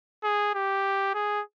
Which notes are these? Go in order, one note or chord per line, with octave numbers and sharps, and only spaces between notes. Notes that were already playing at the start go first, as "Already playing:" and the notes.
G#4
G4
G#4